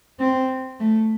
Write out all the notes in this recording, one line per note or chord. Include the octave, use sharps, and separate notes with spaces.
C4
A3